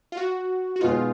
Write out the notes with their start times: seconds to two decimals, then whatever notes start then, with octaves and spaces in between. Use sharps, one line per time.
0.12 F4
0.17 F#4
0.76 F#4
0.81 B2 G#3 B3 D#4 F4